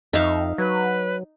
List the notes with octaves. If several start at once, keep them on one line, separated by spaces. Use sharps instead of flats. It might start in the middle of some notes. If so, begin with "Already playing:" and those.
F2 D#4 E5 F5
F#3 B4